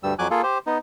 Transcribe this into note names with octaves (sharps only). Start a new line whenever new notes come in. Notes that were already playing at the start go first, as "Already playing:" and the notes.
D2 G2 G3 E6
F2 F#3 G#5 D6 F#6
A#3 F4 G#4 A4
G4 C5
B3 D#4